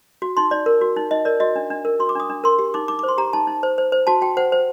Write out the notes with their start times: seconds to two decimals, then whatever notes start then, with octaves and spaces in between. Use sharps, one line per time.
0.22 F#4
0.37 D#4 C6
0.51 D#4 D5
0.66 A#4
0.81 F#4
0.96 D#4
1.11 D#4 D#5
1.25 A#4 D5
1.40 F#4 D#5
1.56 D4
1.70 D4
1.85 A#4
2.00 F#4 C6
2.09 D6
2.15 D4 D#6
2.29 D4
2.44 A#4 C6
2.59 G4
2.74 D#4 D6
2.88 D#4 D6
2.99 D6
3.03 C5 C6
3.18 G4 A#5
3.33 D#4 A5
3.47 D#4
3.63 C5
3.78 C5
3.92 C5
4.07 F#4 A5
4.21 F#4 G5
4.37 C5 F#5
4.52 C5